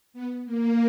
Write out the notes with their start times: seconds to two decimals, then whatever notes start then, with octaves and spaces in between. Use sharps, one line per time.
0.14 B3
0.45 A#3